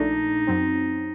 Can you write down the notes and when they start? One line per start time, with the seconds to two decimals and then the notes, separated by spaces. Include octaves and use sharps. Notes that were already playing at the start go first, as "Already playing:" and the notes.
Already playing: A#1 A#2 A3 D4 D#4
0.47 F#2 F#3 C4